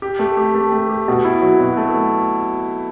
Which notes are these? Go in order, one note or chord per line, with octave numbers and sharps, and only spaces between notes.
G4
A3
G4
A3
A3
G4
B2
E4
F#3
B2
A3